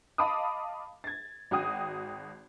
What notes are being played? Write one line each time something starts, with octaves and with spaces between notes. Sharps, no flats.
D#5 F5 A5 B5 D6 D#6
G#6 A6
G#1 F#4 G5 D#6